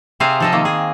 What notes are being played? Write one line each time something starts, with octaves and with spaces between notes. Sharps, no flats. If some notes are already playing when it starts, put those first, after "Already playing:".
C3 C4 G#4 C5 F5
F3 A4 D#5
D#3 A#3
G#4